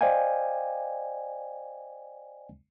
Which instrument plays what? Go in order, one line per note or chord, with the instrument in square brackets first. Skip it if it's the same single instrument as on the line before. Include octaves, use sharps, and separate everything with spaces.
[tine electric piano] C5 D5 D#5 F5 G5 G#5